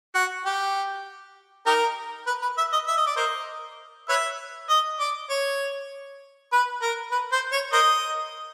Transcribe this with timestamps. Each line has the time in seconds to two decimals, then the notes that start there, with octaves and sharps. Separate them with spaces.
0.15 F#4
0.45 G4
1.66 D#4 G4 A#4
2.27 B4
2.42 B4
2.58 E5
2.73 D#5
2.88 E5
2.97 D#5
3.07 D5
3.16 A#4 C5 D#5
4.09 B4 C#5 E5
4.70 D#5
5.00 D5
5.30 C#5
6.52 B4
6.82 A#4
7.12 B4
7.32 C5
7.52 C#5
7.73 A#4 C5 D#5